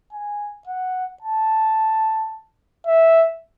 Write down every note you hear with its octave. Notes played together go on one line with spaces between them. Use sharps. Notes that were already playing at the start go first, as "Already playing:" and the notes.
G#5
F#5
A5
E5